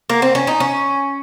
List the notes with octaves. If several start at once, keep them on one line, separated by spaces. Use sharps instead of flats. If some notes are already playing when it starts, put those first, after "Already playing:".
A#3
C4
C#4
D#4
C#4